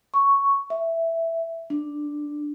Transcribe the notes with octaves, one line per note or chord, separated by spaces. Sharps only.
C#6
E5
D4